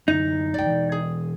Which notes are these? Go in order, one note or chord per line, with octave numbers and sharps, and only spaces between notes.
F#2 D3 D#4
F#1 C2 G2 D5 G5
B2 E3
G#4